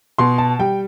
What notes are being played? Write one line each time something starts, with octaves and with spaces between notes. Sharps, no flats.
B2 C6
A5
G3 G5